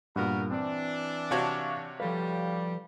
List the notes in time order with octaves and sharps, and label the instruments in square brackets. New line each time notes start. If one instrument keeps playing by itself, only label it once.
[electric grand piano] G2 A#2 [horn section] B3 F#4 A#4
[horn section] E3 D4 [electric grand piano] C4
[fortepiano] C3 F#4 C#5 [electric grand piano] F5 A5 C#6
[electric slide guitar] F3 A4 B4 [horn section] G3 [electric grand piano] F5